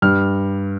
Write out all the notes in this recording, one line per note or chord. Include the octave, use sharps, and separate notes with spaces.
G2 F6